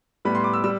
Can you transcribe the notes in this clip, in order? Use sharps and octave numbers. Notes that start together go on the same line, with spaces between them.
A2 G3 B3 B5
C6
D6
E6
G3 E6